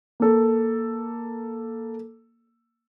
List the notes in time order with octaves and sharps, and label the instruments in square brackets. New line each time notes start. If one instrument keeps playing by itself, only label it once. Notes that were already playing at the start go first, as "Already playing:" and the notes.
[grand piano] A#3 A4